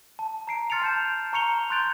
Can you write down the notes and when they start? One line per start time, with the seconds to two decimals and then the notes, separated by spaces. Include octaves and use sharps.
0.19 A5
0.47 A#5 C7 D7
0.70 C6 F6 A6 C#7 D7 F7
0.82 A5 G6 E7
1.33 A#5 C#6 C#7 F7 G7
1.70 C6 F#6 G6 A6 D7 F7